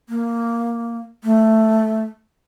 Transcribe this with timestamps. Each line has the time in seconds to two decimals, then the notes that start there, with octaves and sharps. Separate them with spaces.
0.09 A#3
1.23 A3